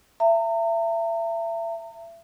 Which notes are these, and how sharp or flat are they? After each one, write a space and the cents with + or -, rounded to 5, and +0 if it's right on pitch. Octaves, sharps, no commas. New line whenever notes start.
E5 +30 A#5 -40